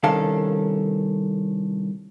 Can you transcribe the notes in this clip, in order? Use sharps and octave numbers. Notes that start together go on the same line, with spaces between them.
C2 D#3 C#4 A4 F5